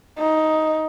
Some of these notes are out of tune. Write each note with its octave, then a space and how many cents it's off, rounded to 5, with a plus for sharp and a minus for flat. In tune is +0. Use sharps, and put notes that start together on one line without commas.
D#4 +10